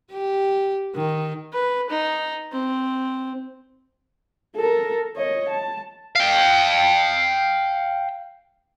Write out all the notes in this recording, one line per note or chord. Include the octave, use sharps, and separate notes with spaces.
G4
D#3
B4
D#4
C4
A4 A#4
C#5 D#5
A5
F5 G5